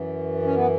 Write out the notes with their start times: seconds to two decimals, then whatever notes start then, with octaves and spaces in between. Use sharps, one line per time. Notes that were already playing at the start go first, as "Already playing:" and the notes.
Already playing: F#2 E3
0.43 C#4
0.55 B3